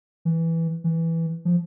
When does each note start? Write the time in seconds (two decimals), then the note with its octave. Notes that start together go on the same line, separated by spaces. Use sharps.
0.25 E3
0.84 E3
1.45 F3